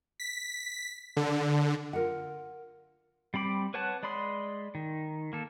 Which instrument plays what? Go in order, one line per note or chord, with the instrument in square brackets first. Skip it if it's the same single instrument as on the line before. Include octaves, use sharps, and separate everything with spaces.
[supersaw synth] B6
D3
[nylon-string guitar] F4 A#4 F#5
[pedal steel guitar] G3 C4 B5 D6
B4 C#5 F#5 A5 F#6
G#3 D5 B5 C6 D#6
D#3
A#3 A4